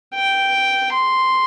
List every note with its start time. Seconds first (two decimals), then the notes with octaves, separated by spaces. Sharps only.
0.14 G5
0.93 C6